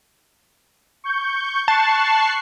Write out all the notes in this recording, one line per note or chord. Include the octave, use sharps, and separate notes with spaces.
C#6 G6
A5 C#6 F#6 C7